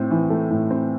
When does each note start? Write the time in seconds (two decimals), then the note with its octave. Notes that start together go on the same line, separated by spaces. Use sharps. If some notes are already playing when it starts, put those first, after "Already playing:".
Already playing: A2 C4
0.11 E3
0.30 A3
0.51 A2
0.71 C4